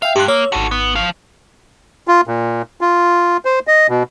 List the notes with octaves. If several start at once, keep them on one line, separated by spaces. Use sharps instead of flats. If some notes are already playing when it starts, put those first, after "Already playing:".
E5 F5 G5
G2 G4 C6 F#6
A#3 C#5 E6
G#1 F#4 A4 C#6
B3
F3 F5
F4
A#2
F4
C5
D#5
B2